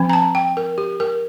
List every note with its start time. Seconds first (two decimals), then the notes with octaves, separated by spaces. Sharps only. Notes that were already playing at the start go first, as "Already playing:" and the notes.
Already playing: F3 C4
0.10 A#5
0.13 A5
0.35 G5
0.57 A#4
0.78 G4
1.00 A#4